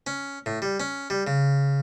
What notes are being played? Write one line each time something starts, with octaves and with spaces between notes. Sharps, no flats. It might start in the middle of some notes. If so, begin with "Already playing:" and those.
C#4
A2
G3
C#4
G3
C#3